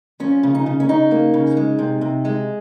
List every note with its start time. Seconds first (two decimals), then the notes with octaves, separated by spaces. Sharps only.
0.20 F3 C#4
0.43 C#3
0.55 D#4
0.66 C#3
0.80 C#4
0.89 C#3 D#4
1.11 A#3
1.34 C#3
1.57 G#3
1.79 C3
2.01 C3
2.25 G#3